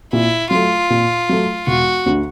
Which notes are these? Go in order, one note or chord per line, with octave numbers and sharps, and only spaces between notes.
A#2 E4
F#3 A3 F4
A#2
F#3 A3
E1 F#4
D2 D3